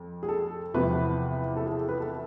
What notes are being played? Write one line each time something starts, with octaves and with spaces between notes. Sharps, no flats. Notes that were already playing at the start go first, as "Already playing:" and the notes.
Already playing: F2
G#4
A4
E2 C3 F3 B3 B4
A4
G#4
B4
A4